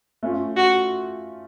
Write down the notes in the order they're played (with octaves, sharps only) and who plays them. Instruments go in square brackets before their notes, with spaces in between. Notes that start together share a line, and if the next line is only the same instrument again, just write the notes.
[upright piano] A3 C#4 F4
[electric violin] F#4